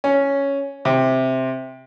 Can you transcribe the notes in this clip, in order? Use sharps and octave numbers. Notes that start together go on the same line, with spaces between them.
C#4
C3